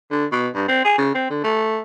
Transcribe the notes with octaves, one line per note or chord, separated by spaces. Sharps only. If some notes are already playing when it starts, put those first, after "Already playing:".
D3
B2
G2
C4
G#4
C#3
C4
D3
A3